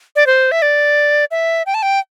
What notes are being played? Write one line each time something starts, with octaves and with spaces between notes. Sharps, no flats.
D5
C5
E5
D5
E5
G5
A5
G5